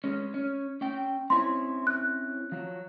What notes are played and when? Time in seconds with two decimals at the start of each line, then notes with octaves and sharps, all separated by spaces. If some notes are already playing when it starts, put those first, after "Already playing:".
0.04 G#3 C#4
0.34 C#4
0.81 C#4 G5
1.30 C4 C#4 E4 C6
1.87 F#6
2.52 F3 F#3